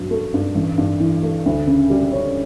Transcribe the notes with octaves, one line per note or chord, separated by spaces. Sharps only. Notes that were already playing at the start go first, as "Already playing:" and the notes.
Already playing: G2 F#3
A3
G2
A1
G2
E3
A3
D2
C#3
G3
C#4